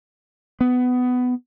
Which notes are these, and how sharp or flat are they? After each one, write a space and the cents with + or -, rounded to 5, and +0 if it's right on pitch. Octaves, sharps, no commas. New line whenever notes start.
B3 +15